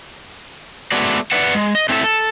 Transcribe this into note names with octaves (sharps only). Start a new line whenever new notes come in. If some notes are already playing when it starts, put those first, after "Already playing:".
G#3 A3 B3 F#4 D5
B4 D5 E5 F#5
G#3
D#5
A3 C4 E4 F#4 A4 E5
A4